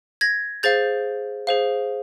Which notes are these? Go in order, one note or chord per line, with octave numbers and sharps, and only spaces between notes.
G#6 A#6
G#4 C5 F5 G6 A6
G#4 C5 F5